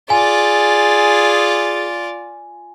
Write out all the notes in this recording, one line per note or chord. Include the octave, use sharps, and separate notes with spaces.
F4 G#4 D5 G#5